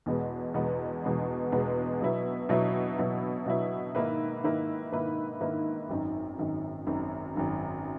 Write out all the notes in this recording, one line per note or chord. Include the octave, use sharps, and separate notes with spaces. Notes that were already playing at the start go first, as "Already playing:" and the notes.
E2 B2 G#3 B3
E2 B2 G#3 B3
E2 B2 G#3 B3
E2 B2 G#3 B3
B2 F#3 B3 E4
B2 F#3 B3 E4
B2 F#3 B3 E4
B2 F#3 B3 E4
G#2 D#3 A#3 E4 B4
G#2 D#3 A#3 E4 B4
G#2 D#3 A#3 E4 B4
G#2 D#3 A#3 E4 B4
G#1 F#2 D#3
G#1 F#2 D#3
G#1 F#2 D#3
G#1 F#2 D#3